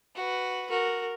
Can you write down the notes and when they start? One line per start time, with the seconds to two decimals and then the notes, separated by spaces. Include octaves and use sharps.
0.16 F#4 B4
0.70 F#4 A#4